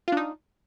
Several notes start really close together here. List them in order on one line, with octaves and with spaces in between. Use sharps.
F4 D4 D#4